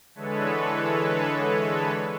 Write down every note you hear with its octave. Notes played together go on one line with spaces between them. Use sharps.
D3 E3 G#3 A4 B4 C#5